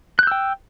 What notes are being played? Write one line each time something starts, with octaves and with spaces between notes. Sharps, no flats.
G5 E6 F#6 G6